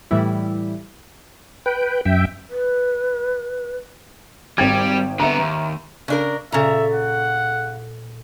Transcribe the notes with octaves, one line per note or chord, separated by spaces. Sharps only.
A2 E3 G3 E4
B4 G5
F#2 E5 G5
B4
G#1 G3 G5 G#6
D3 B3 E5 A#5
D#2
C#3 D4 A#4
A#2 C#3 A4 E5 A#5 A6
F#5